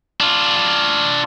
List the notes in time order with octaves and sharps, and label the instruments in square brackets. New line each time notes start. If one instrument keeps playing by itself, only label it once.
[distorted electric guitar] D4 F4